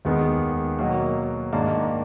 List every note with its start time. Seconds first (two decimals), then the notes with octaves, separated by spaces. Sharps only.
0.05 D#2 D#3 G#3 B3
0.79 B2 F#3 A#3
1.53 G#2 D#3 A#3 D4